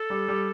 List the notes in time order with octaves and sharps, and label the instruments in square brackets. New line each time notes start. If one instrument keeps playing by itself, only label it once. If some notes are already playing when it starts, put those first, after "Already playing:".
Already playing: [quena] A4
[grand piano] G3
G3